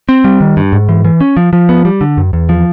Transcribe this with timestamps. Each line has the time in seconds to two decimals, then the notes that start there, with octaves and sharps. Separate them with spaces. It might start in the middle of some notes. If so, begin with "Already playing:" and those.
0.09 C4
0.24 G3
0.41 D#3
0.57 G2
0.73 G#2
0.89 E3
1.05 E3
1.21 C#4
1.37 F3
1.53 F3
1.69 B3
1.85 G3
2.01 D3
2.17 F#2
2.33 E2
2.49 F3